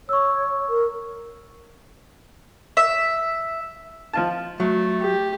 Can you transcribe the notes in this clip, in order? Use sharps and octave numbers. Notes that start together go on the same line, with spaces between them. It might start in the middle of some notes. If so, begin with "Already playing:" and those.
C#5 C#6 E6
A#4
E5
F3 F4 A5
F#3 A3
G4